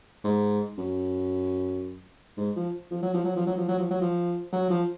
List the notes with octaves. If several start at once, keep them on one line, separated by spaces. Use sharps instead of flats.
G#2
F#2
G#2
F3
F3
F#3
F3
F#3
F3
F#3
F3
F#3
F3
F#3
F3
F#3
F3